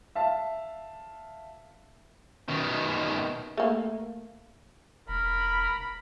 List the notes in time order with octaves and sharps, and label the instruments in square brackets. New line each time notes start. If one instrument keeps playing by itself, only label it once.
[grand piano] E5 F5 A5
[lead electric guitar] B2 D#3
[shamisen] A3 A#3
[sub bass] E1 [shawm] A#4 [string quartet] B5